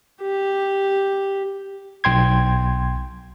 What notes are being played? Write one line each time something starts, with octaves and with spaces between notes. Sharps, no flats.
G4
B1 G5 C6 G#6